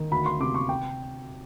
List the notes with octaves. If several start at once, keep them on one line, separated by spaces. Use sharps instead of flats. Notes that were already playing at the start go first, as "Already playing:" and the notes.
Already playing: D#3
D2 B5
C6
C3 D6
C#6
G5